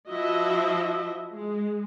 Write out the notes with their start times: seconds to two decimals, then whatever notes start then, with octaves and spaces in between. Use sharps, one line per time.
0.10 F3 E4 F#4 D#5 E5
1.34 G#3